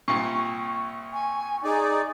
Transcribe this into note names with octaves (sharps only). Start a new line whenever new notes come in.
C2 A#2 C#6
G#5
D#4 G#4 D5